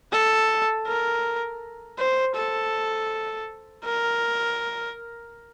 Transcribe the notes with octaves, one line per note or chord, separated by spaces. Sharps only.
A4
A#4
C5
A4
A#4